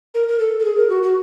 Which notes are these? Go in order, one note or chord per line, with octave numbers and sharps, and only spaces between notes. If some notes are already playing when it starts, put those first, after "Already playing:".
A#4
A#4
A4
A4
G#4
A#4
F#4
F#4